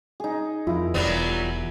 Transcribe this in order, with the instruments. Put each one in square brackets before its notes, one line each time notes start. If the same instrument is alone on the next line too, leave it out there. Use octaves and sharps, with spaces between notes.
[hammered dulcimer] D#4 G#4
[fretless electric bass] F2 [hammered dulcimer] E4 A#4 [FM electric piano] F4
[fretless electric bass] E1 E2 [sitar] F#3 G3 B3